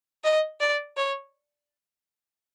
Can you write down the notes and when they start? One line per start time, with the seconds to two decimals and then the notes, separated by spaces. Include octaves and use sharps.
0.24 D#5
0.60 D5
0.97 C#5